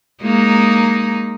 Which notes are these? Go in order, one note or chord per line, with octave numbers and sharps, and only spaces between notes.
G#3 A#3 D#4